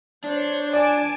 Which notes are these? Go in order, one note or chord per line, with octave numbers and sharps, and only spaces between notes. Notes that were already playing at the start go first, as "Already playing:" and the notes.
D4 C5 C#5
D5 G#5 A5 D7